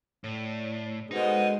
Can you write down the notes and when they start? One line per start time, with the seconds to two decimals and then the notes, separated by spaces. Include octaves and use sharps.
0.24 A2 C#5 D5
1.11 B2 G#3 D#4 A4 C5 F#5